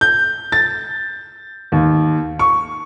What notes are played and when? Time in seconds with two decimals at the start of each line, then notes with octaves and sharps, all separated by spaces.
0.01 G6
0.52 A6
1.72 D#2
2.39 C#6